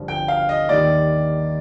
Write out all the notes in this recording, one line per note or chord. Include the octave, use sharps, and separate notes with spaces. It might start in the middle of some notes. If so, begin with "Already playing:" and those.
Already playing: G1 G2 F3
G5
F5
D#5
D#2 D#3 G3 D5